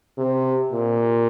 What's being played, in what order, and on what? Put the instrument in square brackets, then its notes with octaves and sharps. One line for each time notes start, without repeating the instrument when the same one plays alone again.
[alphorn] C3
A#2